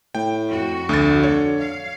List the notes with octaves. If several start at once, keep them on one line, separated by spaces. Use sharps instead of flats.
A2 G5
F2 F#4
D2 D3 A6
C#5
F5